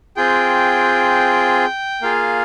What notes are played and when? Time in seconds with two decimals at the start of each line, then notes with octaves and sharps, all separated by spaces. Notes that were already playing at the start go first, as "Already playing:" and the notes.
0.16 C4 F4 G#4 G5
2.02 A#3 F4 G#4 F5